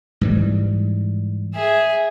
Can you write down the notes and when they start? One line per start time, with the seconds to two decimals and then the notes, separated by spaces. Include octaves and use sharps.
0.21 G#2 E3 G3
1.54 G#4 E5